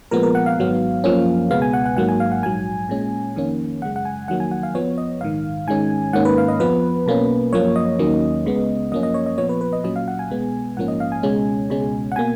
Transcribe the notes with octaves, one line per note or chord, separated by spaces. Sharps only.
A#2 F3 G#3 B3 A#4
A#4
F#5
F5
G#1 G#2 F#3 B3
F#2 F3 A#3 C#4
C#2 B2 G#3 B3 F5
G#5
F#5
F#5
G#1 G#2 F#3 A#3 F#5
G#5
F5
F#5
A#1 G#2 F#3 G#5
A#2 G#3 C#4
F2 D#3 A#3 C#4
F#2 C#3 G#3 F#5
F#5
G#5
F2 D#3 F#3 A#3 F#5
G#5
F#5
F5
F2 F3 B3 C#5
D#5
A#1 G#2 D#3 F5
G#2 D#3 G#3 C#4 G#5
G#2 D#3 A#3 C#4 F#5
B4
F5
D#5
F2 F3 B3 B4
B1 B2 A#3 C#4
F#2 F3 A#3 C#5
D#5
D#2 D#3 F#3 A#3 C#4
C#2 C#3 G#3 B3
F#2 F3 A#3 C#4 D#5
D#5
C#5
D#5
A#2 F3 B3 C#5
B4
B4
D#5
A#2 F#3 C#4 D#5
F5
F#5
G#5
B1 B2 G#3 B3
A#1 G#2 F3 A#3 C#4 F#5
D#5
F5
G#5
C#2 B2 G#3 C#4
C#2 B2 G#3 C#4
F#5
B2 A#3 G#5